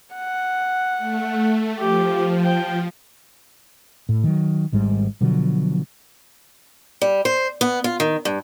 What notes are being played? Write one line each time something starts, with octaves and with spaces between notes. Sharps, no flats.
F#5
A3
F3 G4
G5
A2
D#3 F#3
G#1 G#2 G3
B2 D3 F3 F#3
G3
C5
B3
F4
D#3
G2